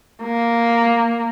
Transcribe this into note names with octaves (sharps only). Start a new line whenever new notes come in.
A#3